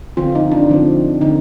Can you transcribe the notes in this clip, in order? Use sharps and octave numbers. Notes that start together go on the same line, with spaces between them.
D3 F3 C4 F4
D#4
D4
D3 F3 C4
D3 F3 C4 D#4